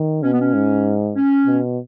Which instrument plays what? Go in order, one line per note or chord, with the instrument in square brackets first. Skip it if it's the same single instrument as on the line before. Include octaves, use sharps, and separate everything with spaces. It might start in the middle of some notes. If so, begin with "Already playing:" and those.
Already playing: [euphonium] D#3
[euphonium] B2 [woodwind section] C#4
[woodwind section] B3
C#4
[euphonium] G#2
[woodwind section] C#4
[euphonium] B2